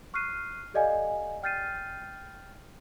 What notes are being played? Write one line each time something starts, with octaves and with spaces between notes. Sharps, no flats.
C#6 F6 F#6 C7 D#7
G4 A4 D5 D#5 F5 G#5
G5 F6 G6 A6 C7 D#7